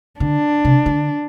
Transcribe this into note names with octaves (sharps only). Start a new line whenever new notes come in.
D3 D4
C3
D3